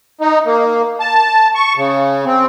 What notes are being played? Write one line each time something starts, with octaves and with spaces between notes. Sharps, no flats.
D#4
A#3
A5
C#6
C#3
C4